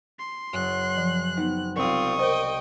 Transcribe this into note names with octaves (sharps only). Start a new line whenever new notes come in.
C6
F#1 F#2 F#6
F3
B3 C4 D#4
C2 C4 F4 C#6 D#6
A#4 C5 D#5 G5